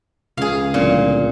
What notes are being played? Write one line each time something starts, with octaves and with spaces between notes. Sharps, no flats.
C#2 C#3 G#4 F5
D1 A#2